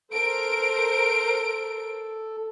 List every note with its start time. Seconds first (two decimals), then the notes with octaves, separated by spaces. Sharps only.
0.12 A4 A#4 C5 D7